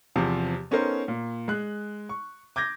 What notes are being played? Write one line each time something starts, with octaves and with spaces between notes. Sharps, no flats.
E2 C3 F3
B3 C#4 D#4 A4 A#4 C5
A#2
G#3 F#6
C#6
D6 G6 G#6 A#6